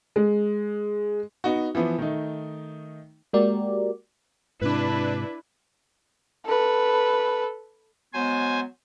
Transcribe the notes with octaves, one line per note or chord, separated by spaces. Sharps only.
G#3
B3 D#4 F#4
E3 F3 B3
D#3 A3 D#4
G#3 A#3 F#4 G4 A#4 D5
G#2 C3 D4 E4 B4
A4 B4
F#3 G#3 B3 C5 G#5